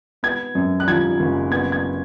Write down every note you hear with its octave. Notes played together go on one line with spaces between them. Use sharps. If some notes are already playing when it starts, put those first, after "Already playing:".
B3 G#6
F#2
F#6
F3 G#6
F#1
B3 G#6
G#6